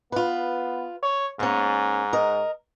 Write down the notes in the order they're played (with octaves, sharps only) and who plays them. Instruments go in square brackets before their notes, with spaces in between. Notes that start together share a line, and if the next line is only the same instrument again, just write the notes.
[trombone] B3 [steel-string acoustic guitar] F4 B4
[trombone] C#5
[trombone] G#2 [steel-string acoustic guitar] A#3 C#4
[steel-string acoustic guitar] A#4 D#5